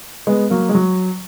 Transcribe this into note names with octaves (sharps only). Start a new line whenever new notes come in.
G#3 B3
F#3 A#3
G#3
F#3